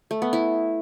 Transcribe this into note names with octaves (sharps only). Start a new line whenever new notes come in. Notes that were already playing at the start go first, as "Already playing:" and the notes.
A3
B3
E4